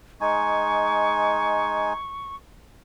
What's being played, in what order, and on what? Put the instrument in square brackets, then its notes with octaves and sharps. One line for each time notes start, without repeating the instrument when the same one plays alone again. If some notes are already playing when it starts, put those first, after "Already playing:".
[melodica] G#3 D#4 G#5 [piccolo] C#6